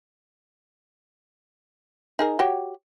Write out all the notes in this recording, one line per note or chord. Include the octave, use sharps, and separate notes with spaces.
D#4 G#4 A#4
F#4 G4 C#5